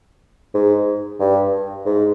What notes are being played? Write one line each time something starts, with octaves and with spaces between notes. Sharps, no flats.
G#2
G2
G#2